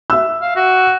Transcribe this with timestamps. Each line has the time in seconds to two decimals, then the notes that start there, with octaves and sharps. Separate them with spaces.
0.10 E5 E6
0.42 F5
0.56 F#4